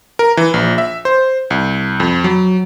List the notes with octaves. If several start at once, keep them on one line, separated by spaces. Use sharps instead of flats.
A#4
E3
A#1
E5
C5
C2
F2
F#3